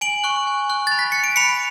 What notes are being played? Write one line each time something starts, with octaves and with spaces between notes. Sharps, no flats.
G#5 D7 F#7
C#6 F#6
G#5
C#6 F#6
B5 A6
B6
F#6 C#7
D7
B5 C#7 F7